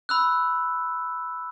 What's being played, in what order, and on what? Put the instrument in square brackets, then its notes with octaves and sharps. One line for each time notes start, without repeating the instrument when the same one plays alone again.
[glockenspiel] B5 E6 F#6